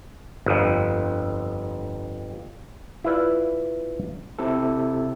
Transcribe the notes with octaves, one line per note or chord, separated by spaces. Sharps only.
G1 F2
E4 F4 B4 D5 E5
C3 E4 A4